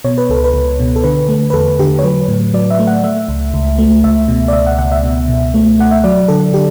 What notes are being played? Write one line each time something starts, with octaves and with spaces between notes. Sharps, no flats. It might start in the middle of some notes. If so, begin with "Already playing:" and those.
B2 C#5
B4
C#2 A4
B4
C#2
B2
A4
D3 B4
A3
B4
E2 A4
D3 G4
C#5
F#3 B4
A2
F#3 D5
E5
A3
F#5
A3 E5
C#2
C#2
A3
C#2 E5
B2
D5
C#2 E5
F#5
C#2 F#5
E5
B2
B2
A3
A3 F#5
E5
F#3 D5
D3 A4
D3 G4